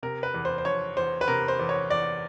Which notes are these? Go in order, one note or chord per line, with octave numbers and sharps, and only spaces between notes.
C3 A#4
B4
E2
C5
C5
F3 C#5
E2 C5
B4
C3 A#4
C5
E2
C#5
E2 D5